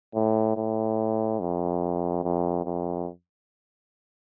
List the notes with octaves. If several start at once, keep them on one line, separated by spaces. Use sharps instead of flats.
A2
A2
F2
F2
F2